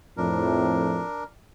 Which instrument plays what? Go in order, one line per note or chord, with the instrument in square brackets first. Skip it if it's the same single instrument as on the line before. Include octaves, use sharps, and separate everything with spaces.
[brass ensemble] F2 A2 [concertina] D4 A#4